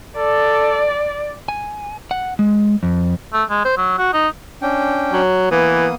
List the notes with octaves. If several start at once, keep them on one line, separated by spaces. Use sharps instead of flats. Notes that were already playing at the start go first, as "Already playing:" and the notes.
A4 D5
G#5
F#5
G#3
F2
A3
G#3
C5
F#3
F#4
D#4
C#4 D4 G5
F#3
E3 A#3 B3 D#6